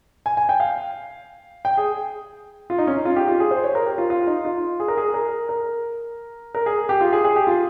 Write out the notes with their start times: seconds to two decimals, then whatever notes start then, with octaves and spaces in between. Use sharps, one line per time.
0.26 G#5
0.37 G#5
0.49 G5
0.60 F5
1.65 G5
1.77 G#4
2.70 F4
2.78 D#4
2.87 C#4
2.97 D#4
3.05 F4
3.16 G4
3.28 F4
3.40 G#4
3.51 C5
3.64 C#5
3.75 A#4
3.86 G4
3.98 F4
4.10 F4
4.27 D#4
4.45 F4
4.80 G#4
4.88 A#4
4.97 G#4
5.14 A#4
5.49 A#4
6.55 A#4
6.66 G#4
6.89 G4
7.01 F4
7.13 G#4
7.24 G#4
7.36 G4
7.47 F4